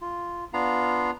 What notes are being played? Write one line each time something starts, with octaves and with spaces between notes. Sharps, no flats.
F4
B3 D4 F4 F5 A#5